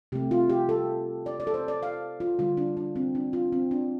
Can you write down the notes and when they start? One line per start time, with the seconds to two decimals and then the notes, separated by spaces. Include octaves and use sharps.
0.12 C3 A3 G4
0.31 F4
0.50 G4
0.69 A4
1.26 D5
1.40 D5
1.47 A4
1.54 C5
1.68 D5
1.83 F5
2.20 F4
2.39 D3 G3 F4
2.57 D4
2.77 D4
2.96 C4
3.15 D4
3.33 F4
3.52 C4
3.71 D4